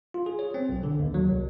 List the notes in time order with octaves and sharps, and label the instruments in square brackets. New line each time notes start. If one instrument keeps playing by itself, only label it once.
[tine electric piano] F4
G#4
C#5
C4
B1
D3
D#2
F#3
C2